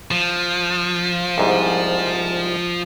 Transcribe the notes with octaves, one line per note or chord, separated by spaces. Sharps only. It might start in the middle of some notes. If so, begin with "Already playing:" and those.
F3
C2 G#2